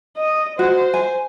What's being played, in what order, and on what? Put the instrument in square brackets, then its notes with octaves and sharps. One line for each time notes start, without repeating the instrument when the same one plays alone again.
[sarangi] D#5
[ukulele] F#4 [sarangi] C5
[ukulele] G#5